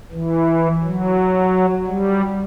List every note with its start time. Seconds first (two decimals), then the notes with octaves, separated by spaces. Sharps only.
0.12 E3
0.83 F#3
1.87 G3